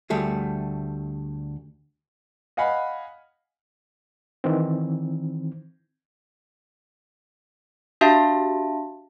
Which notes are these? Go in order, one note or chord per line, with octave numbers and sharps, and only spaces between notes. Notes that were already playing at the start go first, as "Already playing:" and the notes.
D2 G3 A3 G#4
D#5 F5 F#5 G#5 B5
D#3 E3 C4
D4 F#4 G4 E5 F5 A5